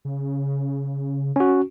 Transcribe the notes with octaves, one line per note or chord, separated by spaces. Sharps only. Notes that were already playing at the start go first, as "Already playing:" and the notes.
C#3
C#4 F#4